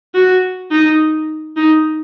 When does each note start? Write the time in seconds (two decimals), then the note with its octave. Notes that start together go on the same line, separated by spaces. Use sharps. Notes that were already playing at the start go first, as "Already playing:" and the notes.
0.15 F#4
0.71 D#4
1.57 D#4